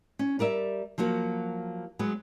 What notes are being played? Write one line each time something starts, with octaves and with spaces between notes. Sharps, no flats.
C#4
G3 A#4 D5 E5
F3 F#3 A#3 F#4
F#3 G#3 B3